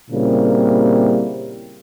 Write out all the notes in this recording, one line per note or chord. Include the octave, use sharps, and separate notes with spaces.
A#2 C#3 G3 A#3 C4 E4